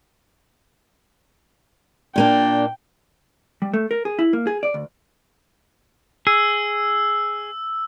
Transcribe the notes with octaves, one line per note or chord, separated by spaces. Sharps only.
A#2 A#3 D4 G5
G3
A3
A#4
G#4
E4
A#3
G#4
D5
D2
G#4 E6